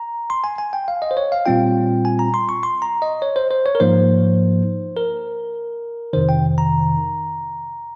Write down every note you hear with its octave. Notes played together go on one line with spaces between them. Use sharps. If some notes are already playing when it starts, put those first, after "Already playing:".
Already playing: A#5
C6
G#5
G#5
G5
F5
D#5
C5
C#5
F5
A#2 G3 C4 F4 G5
G#5
A#5
C6
C#6
C6
A#5
D#5
C#5
C5
C5
C#5
A#4
G#2 F3 A#3 D#4 C5
A#4
F2 C3 D#3 C5
G5
A#5